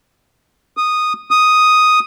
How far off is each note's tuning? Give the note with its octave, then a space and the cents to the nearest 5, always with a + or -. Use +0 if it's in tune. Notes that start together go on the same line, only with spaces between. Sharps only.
D#6 -10
D#6 +0